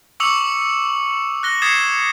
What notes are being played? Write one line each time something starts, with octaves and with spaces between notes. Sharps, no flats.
C#6 D6 E6 C#7 F7 F#7
F#6 A#6 G7
D#6 G#6 A6 C7 C#7 E7